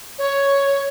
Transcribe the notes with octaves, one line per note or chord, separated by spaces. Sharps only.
C#5